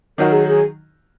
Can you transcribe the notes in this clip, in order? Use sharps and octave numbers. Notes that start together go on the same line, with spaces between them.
D#3 F#3 D#4 F#4 A#4
G#4
G#4